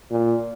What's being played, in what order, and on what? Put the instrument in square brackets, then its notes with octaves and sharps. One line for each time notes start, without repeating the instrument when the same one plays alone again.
[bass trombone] A#2